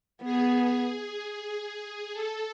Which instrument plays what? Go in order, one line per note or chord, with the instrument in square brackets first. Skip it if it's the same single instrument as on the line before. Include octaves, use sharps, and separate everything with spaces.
[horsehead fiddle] B3 [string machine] G#4
[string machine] A4